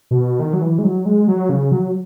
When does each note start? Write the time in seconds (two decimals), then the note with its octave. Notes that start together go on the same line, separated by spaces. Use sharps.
0.11 B2
0.39 D#3
0.53 F#3
0.62 E3
0.79 G#3
0.84 F#3
1.06 G#3
1.28 F#3
1.49 C#3
1.71 F#3